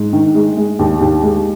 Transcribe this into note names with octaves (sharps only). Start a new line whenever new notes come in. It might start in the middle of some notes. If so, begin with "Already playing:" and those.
Already playing: G#2
D#3
G#3
G#3
D#2
D#2
G#3